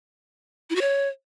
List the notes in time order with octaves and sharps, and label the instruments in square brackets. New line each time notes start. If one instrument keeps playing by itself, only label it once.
[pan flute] E4
F#4
C#5